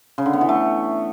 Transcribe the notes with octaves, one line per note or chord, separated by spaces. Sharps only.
C#3
D3
B3
E3
A3